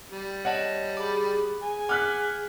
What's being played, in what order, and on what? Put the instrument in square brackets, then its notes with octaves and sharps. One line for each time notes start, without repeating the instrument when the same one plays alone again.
[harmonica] G3
[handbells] C#5 D#5 A5 [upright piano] F#5
[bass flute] G#4 [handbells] B5 D6
[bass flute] G#4 [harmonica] G#5
[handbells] F#5 D6 [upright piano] F6 F#6 B6